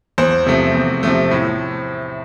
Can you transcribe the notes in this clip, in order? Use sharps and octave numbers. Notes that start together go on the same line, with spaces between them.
E2 C5
C3 F3 A3
E2
C3 F3 A3
A2